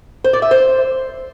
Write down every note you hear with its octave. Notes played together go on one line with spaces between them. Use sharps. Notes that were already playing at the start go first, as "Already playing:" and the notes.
C5
D5
E5
C5